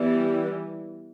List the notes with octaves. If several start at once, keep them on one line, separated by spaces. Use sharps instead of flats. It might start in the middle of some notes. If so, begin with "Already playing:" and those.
Already playing: E3 G3 B3